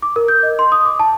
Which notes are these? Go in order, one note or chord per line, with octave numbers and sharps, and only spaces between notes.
D6
A#4
G6
D#5
C6
D#6
D6
A5